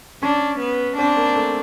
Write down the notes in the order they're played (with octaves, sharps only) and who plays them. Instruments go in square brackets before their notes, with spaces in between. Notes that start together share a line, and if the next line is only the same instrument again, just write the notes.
[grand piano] C#4 [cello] D4
[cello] B3
[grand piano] C4 [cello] D4
[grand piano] A#3
A3